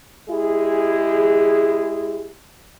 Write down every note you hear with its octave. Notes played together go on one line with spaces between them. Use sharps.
G#3 E4 G4 G#4